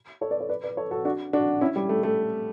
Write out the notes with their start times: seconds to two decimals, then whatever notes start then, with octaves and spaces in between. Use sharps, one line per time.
0.21 A4 C#5
0.30 B4 D5
0.40 A4 C#5
0.49 B4 D5
0.64 B4 D5
0.77 A4 C#5
0.91 F#4 A4
1.05 D4 F#4
1.33 D4 F#4
1.61 C#4 E4
1.76 G3
1.89 A3
2.03 A3